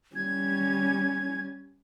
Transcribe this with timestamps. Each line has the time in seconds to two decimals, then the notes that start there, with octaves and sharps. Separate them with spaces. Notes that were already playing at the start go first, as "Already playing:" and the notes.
0.15 G3 C#4 G#6